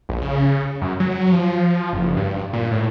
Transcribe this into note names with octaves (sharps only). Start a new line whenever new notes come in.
A#1
C#3
F#2
F#3
F#3
F3
F#1
G2
A#2
A2